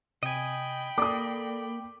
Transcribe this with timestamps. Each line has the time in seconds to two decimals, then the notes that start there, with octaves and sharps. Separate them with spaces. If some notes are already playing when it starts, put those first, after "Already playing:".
0.23 C3 D#5 G5 G#5 B5
0.98 A#3 A4 D5 D6 D#6